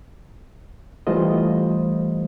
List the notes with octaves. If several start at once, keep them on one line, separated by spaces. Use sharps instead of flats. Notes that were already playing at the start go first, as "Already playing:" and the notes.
E3 G3 A3 F4 C5 D#5